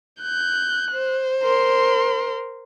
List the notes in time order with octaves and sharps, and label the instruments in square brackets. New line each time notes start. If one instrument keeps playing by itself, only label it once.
[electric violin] F#6 [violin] G6
[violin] C5
[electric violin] A#4 C6